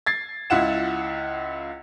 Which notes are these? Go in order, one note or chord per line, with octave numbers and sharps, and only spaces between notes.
G#6 A6 C7
C#2 E4 F4 F#5 E7